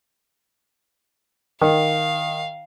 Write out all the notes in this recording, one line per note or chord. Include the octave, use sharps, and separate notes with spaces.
D#3 F5